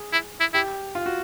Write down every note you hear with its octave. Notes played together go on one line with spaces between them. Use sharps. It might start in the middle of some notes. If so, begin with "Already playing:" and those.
Already playing: G#4
E4
E4
E4 G4
F4
F#4